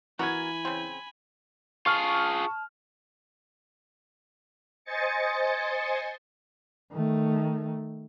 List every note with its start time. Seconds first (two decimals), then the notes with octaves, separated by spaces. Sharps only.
0.19 E3 B3 F#4 A#4 G#5 B5 G#6
0.65 C#3 C4
1.86 F4 G#4 A5 C#6 F6
4.85 C5 D#5 G#5 A6 C#7
6.93 D#3 A3